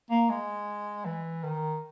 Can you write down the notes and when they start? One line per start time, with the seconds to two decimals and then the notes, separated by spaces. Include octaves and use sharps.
0.10 A#3
0.29 G#3
1.05 E3
1.43 D#3